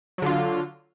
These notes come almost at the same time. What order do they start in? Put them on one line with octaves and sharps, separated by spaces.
F#3 D3 F4